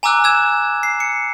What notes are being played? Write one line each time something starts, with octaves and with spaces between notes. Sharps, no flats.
G#5 A#5 D6 E6 F#6
E6 G#6 E7
C7
C#7